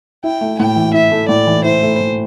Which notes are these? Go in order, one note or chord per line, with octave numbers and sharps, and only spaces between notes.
E4 G5
A3
A2 G5
E3
E4 E5
A3
A2 D5
E3
E4 C5
A3
A2